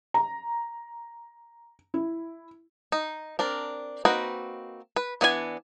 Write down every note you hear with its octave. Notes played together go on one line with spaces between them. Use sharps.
A#5
E4
D#4
C4 D4 A#4
A#3 C4 D#4 F#4 B4
B4
E3 B3 D4 F#4 G#5